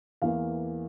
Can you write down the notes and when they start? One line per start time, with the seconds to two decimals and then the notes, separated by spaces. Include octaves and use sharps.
0.22 E2 E3 A#3 F5